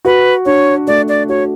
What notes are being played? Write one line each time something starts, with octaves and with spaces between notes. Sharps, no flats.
F#4 B4
D4 C#5
A3 D5
D5
F#4 C#5